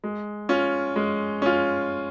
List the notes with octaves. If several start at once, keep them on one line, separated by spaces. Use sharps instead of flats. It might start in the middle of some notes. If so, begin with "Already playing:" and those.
G#3
C#4 F4
G#3
C#4 F4